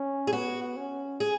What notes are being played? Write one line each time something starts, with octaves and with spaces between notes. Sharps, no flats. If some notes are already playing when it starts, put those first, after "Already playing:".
Already playing: C#4
G#4
B3 F#4
C#4
G#4